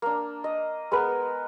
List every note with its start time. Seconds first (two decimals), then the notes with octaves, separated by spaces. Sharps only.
0.02 A#3 D4
0.44 D#5
0.91 G#3 B3 A#4 B4